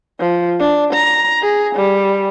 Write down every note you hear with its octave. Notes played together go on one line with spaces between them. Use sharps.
F3
D4
A#5
G#4
G3